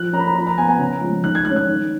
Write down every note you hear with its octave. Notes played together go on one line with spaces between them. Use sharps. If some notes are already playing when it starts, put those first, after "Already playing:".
Already playing: F3 F#6
A#3 C#4 A#5
B5
A#5
F3 B5
A#5
B3 G#5
G#5
C#3 A#5
F3 G#3
D#3 F#6
G#6
G#3 F#6
C#4
F#6
D#3